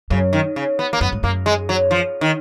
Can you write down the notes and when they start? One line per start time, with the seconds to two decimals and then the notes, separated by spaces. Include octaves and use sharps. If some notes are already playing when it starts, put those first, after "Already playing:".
0.11 F#2 C#3
0.33 D#3
0.56 C#3
0.79 B3
0.93 A#3
1.01 F#2 B3
1.12 G#2
1.23 F#2 A#3
1.46 G#3
1.69 F#3
1.91 F3
2.21 D#3